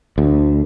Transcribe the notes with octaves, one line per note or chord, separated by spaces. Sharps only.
D2